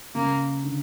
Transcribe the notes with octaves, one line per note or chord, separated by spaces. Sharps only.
C#3 A#3
D3